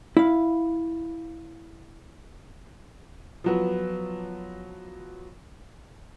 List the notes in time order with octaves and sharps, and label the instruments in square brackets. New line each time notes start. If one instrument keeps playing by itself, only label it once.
[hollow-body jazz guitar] E4 F5
[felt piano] F3 F#3 B3